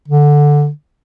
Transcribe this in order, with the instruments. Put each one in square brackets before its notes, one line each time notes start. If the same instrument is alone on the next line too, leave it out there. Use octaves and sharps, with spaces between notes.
[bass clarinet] D3